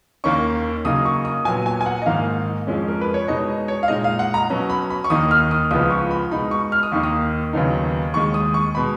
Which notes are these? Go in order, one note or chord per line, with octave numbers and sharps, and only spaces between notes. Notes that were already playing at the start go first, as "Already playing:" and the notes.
D#2 D#3 A#3 C#4 C#6
C#3 F#3 A#3 D#4 D#6
C#6
D#6
A#2 F#3 B3 G#5
G#5
G#5
F#5
D#5
G#2 D#3 A#3 D#4 F5
F2 F3 G#3 C#4
A#4
B4
C#5
B2 G#3 D#4 D#5
C#5
F5
A#2 G#3 D#4 D#5
F5
F#5
A#5
B2 F#3 C#4
B5
B5
C#6
D#2 D#3 A#3 D#4 D#6
F6
D#6
C#2 C#3 F3 B3 D#6
C#6
B5
B2 G#3 D#4 B5
C#6
F6
D#6
D#2 D#3 A#3 D#4 C#6
D#6
D#2 C#3 F#3 B3 D#4
D#2 D#3 G#3 C#6
D#6
C#6
B2 G#3 B5